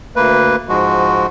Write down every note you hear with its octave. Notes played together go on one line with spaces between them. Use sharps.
D2 A#3 B4
G#2 F3 G#3 F#4